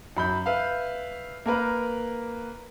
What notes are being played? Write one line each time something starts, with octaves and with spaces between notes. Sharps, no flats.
F#2 B5 G6
B4 E5 F5
A#3 A#4 B4